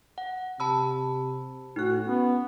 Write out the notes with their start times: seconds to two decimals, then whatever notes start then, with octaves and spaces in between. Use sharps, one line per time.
0.18 F#5
0.60 C3 A5 B5 E6
1.76 A2 D#4 F#4 F#6
2.06 B3 C#4